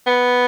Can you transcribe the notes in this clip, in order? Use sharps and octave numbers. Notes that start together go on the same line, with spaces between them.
B3